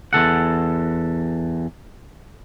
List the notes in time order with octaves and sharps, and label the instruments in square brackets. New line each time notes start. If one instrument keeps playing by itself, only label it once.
[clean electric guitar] E2 A4 F#5